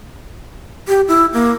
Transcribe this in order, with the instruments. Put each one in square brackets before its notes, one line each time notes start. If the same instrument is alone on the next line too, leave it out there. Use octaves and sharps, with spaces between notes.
[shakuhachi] G4
E4
A#3